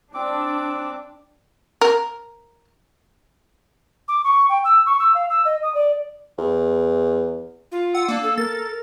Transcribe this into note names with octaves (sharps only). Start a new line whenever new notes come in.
C4 D4 D6
A#4
D6
C#6
G5
E6
C#6
E6
F5
E6
D#5
D#6
D5
E2
F4
F#5 E6
A#3 D4
A4
A#4 A6